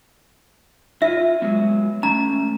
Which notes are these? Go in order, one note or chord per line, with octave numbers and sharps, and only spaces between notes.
E4 F4 E5
F#3 G#3 B3
A3 C#4 A#5